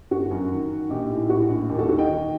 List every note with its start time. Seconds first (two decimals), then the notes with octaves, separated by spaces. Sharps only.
0.11 G1 F#4
0.31 F#2
0.51 D#3
0.71 D#3
0.90 A#1 D#4 G4
1.10 A2
1.29 A2 F#4
1.49 A#1
1.69 D#2 D#4 G4
1.78 F#4 A4
1.89 D#3 F#4 A4
1.99 D#5 G5
2.09 D#3